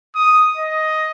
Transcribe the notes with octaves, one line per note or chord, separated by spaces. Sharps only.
D#6
D#5